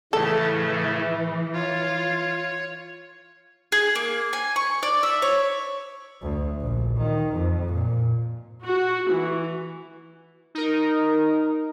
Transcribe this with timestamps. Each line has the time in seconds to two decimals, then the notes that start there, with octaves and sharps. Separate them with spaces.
0.13 A2 C#3 E3 A3 A4
1.54 F4 C#5
3.72 G#4
3.95 A#3
4.33 G#5
4.56 C#6
4.83 D5
5.03 E5
5.22 C#5
6.22 D2
6.61 A#1
6.97 D#3
7.33 F2
7.71 A#2
8.63 F#4
9.11 E3
10.55 D#4 A#4